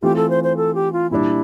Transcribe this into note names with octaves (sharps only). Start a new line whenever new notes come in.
E3 A3 C4 F4 G4
A4
C5
C5
A4
G4
F4
A#2 G3 D4 E4